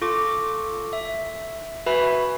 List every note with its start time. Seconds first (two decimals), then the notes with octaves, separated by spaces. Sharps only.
0.02 F4 A4 C#6 D6
0.93 E5
1.86 F#4 B4 E5 G#5 B5